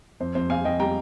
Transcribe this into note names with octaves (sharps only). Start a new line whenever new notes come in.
F2 C5
F2 C5
F2 F5 G#5
F2 D#5 G5
G3 G5 A#5